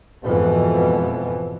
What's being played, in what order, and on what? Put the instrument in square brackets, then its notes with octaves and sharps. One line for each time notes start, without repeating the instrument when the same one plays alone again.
[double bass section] F2 G#2 B2 E3